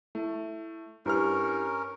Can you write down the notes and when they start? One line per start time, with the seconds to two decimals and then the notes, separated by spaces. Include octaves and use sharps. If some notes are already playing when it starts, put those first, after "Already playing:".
0.15 A3 E4
1.06 G2 C#4 E4 G4 A#4 B4 F6